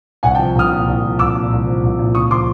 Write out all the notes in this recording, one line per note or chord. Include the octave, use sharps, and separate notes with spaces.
C2 F#5 G#5
G5 A5
F3
C2 D#6 F6
A#2
C2
F3
C2 D6 E6
A#2
C2
F3
C2
A#2
C#2 C#6 D#6
F3 C6 D6